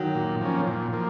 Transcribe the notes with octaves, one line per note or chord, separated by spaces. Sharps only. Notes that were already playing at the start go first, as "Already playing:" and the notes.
Already playing: D#3 F#3
A#2
F3 A#3 C#4
A#2
F3 A#3